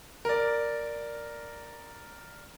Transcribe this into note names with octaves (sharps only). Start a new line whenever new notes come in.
A#4 D5